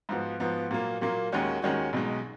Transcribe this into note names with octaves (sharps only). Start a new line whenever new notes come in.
G#2 F3 B3 F#4
G#2 F3 B3 F#4
A#2 F#3 A#3
A#2 F#3 A#3
D#2 D#3 G#3 C#4 F#4
D#2 D#3 G#3 C#4 F#4
B1 B2 G#3 D#4